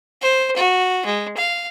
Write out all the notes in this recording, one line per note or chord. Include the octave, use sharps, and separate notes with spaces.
C5
F#4
G#3
F5